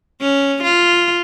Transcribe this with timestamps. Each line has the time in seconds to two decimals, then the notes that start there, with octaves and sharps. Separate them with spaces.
0.21 C#4
0.63 F4